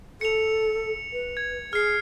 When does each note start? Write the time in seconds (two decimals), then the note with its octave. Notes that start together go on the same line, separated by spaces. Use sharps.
0.21 A4 C#7 F7
1.12 B4
1.37 G#6
1.73 G#4 F6 C7